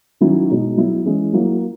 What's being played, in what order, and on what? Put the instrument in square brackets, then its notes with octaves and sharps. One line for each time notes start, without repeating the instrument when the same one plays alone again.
[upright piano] D#3 F#3 C#4 E4
B2 G#3 D#4
F#3 B3 E4
E3 G#3 C#4 E4
F#3 A#3 E4